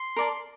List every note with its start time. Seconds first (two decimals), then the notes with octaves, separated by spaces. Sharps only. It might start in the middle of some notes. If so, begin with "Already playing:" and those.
Already playing: C6
0.16 A#4 D5 A5